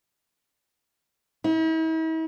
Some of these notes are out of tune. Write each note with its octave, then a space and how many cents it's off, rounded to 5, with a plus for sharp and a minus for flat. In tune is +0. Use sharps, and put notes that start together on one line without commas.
E4 -45